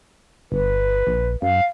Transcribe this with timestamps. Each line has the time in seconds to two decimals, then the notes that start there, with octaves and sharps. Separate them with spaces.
0.52 G1 B4
1.07 A#1
1.42 F#2 F5